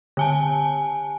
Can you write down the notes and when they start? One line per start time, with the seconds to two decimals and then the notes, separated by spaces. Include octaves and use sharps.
0.17 D3 G#5 A5